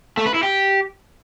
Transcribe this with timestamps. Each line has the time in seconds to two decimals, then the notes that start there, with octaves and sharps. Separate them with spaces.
0.17 A3
0.26 B4
0.34 E4
0.43 G4